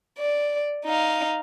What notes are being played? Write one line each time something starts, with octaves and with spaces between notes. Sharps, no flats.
D5
D#4 F5